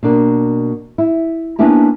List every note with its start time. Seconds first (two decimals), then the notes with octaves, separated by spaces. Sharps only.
0.03 B2 A#3 D4 A#4
0.98 E4
1.59 A#3 B3 C#4 D4 E4 G4